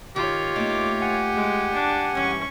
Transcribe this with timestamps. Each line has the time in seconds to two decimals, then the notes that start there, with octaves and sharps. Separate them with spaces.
0.16 D#3 F4 G4 C#5
0.56 A3 A#3 D#4 D6
1.02 F#5 G#5
1.35 G#3
1.74 D4
2.15 G2 E3 C#4 C#6